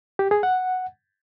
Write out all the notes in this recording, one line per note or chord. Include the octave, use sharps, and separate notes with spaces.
G4
G#4
F#5